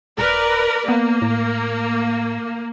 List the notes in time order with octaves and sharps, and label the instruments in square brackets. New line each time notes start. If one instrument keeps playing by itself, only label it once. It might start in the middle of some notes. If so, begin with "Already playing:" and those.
[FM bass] D#1 [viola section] A#4 B4 D5
[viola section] A#3 [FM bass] B3
[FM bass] A2